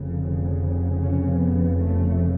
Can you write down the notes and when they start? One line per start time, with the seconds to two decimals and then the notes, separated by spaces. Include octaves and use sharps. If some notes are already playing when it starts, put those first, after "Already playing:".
Already playing: F1 F2 C#3
0.11 D3
0.41 D3
1.03 C#4
1.33 B3
1.79 A3